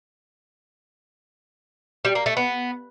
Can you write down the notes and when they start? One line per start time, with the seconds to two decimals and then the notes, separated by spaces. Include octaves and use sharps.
2.05 G3
2.15 A#3
2.26 A3
2.37 B3